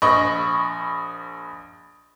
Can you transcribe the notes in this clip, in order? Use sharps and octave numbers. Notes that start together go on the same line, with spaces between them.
A#1 D#5 B5 C#6